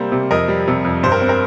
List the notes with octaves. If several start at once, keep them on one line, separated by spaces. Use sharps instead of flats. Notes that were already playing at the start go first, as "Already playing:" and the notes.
Already playing: C3 G3 A#3 C5
C3
F2 A#4 D#5
G3
C3
F2
G2 C5
A#4
C4
A#4